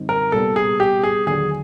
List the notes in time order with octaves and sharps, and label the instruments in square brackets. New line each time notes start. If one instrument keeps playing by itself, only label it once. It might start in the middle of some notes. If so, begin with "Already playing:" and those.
Already playing: [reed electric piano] F#2 D3 G3 C4 D#4
[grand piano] A#4
[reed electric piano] C2 A#2 G3 B3 [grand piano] A4
[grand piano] G#4
G4
G#4
[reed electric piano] D#2 D3 F#3 [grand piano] G#4